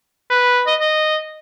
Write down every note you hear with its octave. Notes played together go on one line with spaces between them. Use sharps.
B4
D#5
D#5